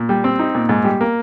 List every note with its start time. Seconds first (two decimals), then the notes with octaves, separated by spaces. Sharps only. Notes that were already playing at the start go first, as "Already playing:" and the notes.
Already playing: A#2
0.09 G3
0.24 C4
0.39 D#4
0.55 A#2
0.69 G#2
0.84 G3
1.01 A#3